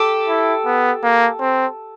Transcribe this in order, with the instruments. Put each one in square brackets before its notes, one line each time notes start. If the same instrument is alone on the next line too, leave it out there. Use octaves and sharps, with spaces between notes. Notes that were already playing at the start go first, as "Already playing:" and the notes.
Already playing: [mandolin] G4 A4
[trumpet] E4
B3
A#3
C4